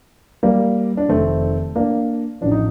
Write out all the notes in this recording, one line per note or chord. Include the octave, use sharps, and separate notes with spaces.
G3 A#3
D4
F1 F2 D#3 A3 C4
A#3 D4
A1 A2 F3 D4
D#4